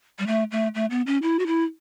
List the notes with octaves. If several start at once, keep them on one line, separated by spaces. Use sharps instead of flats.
G3
A3
A3
A3
B3
C#4
E4
F#4
E4